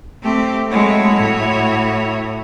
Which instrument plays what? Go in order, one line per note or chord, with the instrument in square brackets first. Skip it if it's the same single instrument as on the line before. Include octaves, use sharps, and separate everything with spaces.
[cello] A3 C4 [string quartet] G4
[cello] G#3 A3 [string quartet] E4 F#4 C#5
[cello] A2